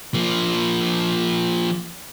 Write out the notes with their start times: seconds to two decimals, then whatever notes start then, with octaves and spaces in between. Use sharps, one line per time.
0.14 F3 A#3